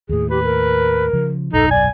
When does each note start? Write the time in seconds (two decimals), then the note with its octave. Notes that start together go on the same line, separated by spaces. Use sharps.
0.09 D#2 A2 G#4
0.30 G4 B4
0.44 A#4
1.13 C#3 F3
1.53 D#1 B1 F#2 D#4 A4
1.70 D5 G#5